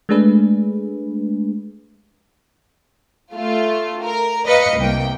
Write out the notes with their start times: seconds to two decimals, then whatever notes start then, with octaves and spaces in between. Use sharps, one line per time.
0.09 G#3 A3 D4 G#4 B4
3.33 A3 F4
4.03 A#4
4.46 B4 D#5 F5 C#7
4.77 C2 A#3 G5